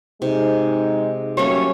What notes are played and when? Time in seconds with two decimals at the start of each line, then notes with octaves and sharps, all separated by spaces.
0.22 C3 G#3 D#4
1.37 F#3 G3 A3 A#3 C#4 C#5